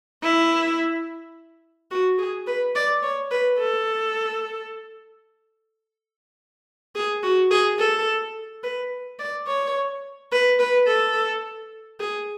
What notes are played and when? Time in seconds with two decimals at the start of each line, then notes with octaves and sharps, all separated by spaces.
0.23 E4
1.91 F#4
2.18 G#4
2.47 B4
2.75 D5
3.02 C#5
3.31 B4
3.59 A4
6.95 G#4
7.23 F#4
7.50 G#4
7.79 A4
8.63 B4
9.20 D5
9.47 C#5
10.32 B4
10.59 B4
10.87 A4
12.00 G#4